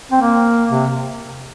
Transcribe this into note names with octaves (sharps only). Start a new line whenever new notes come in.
C4
A#3
C3